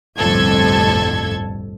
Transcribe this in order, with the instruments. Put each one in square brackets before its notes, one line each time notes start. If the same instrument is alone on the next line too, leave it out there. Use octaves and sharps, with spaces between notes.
[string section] G1 C2 F2 A2 A4 G#6